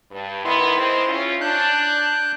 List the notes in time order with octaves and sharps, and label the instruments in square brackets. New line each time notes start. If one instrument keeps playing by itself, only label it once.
[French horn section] G2
[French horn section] D#3 B3 [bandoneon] E4 C6
[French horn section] G#3 C4
C#4 F4
[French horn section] D4 [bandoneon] F#6 G6